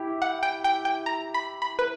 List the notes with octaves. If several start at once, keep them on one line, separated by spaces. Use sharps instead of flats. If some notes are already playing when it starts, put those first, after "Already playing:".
Already playing: E4 G4
F#5
G5
G5
G5
A#5
B5
B5
B4